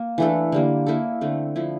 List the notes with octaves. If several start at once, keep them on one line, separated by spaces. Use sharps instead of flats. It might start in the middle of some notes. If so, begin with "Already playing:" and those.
Already playing: A#3
E3 A3 D4 A4
D3 G3 A#3
A#3 E4 A4
D3 A3 C4
D3 F3 A3 E4